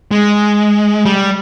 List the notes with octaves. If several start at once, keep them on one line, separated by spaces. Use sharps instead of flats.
G#3
G3